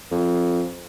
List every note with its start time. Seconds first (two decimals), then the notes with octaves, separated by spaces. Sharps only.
0.12 F2